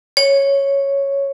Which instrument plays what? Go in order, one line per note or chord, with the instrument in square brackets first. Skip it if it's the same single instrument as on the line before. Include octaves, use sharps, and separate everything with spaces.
[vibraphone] C#5